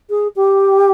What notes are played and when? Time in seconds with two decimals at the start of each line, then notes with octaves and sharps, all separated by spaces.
0.10 G#4
0.36 G4